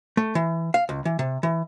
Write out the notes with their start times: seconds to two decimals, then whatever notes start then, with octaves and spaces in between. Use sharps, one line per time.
0.17 A3
0.35 E3
0.74 F5
0.89 C#2
1.05 E3
1.19 C3
1.43 E3